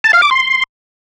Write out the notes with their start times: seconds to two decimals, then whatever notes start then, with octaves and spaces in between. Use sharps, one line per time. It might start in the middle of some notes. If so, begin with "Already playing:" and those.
0.04 A5
0.13 F5
0.22 D6
0.31 C6